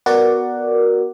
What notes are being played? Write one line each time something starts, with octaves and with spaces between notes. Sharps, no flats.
B3 F#4 A#4 D5 F#5